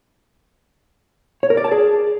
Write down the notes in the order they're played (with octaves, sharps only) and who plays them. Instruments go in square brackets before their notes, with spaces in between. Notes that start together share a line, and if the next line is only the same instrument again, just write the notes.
[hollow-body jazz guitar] C#5
A#4
D5
A5
G#4